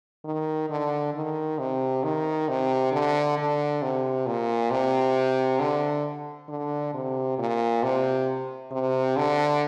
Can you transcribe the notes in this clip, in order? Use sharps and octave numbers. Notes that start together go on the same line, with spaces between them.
D#3
D3
D#3
C3
D#3
C3
D3
D3
C3
A#2
C3
D3
D3
C3
A#2
C3
C3
D3